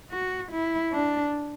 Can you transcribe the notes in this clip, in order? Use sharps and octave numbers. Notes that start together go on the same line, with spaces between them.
F#4
E4
D4